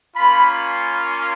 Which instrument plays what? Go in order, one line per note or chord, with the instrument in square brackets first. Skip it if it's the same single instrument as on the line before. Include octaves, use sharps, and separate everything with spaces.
[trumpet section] A#3 C#4 F4 B5